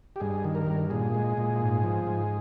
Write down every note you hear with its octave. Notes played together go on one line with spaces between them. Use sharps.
G4
G2 G#4
D#3
A#4
G2
A#2 G#4
G#3
A#2
G#2
F3
G#2